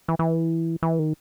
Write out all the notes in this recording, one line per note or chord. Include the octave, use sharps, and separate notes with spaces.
E3
E3
E3
D#3